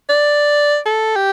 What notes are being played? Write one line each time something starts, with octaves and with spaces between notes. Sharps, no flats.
D5
A4
G4